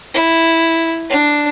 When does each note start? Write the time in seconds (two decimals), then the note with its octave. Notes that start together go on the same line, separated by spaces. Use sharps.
0.14 E4
1.10 D4